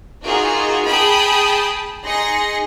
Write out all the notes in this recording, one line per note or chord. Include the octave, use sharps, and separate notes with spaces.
A#3 D#4 F4 F#4 G#4
G#4 G5 A5 B5 D#6
D#4 G#4 C6 A#6 C#7